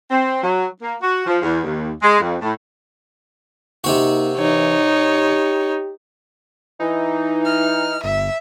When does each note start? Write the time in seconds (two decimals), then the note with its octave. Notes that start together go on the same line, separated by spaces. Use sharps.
0.10 C4
0.43 F#3
0.81 A#3
1.01 F#4
1.25 F3
1.42 E2
1.63 D#2
2.02 G#3
2.20 F2
2.41 A2
3.84 C3 A#3 C4 D#4 F#4
4.38 E3 D#4 C#5
4.97 G4
6.80 E3 D#4
7.46 F6
8.04 G1 E5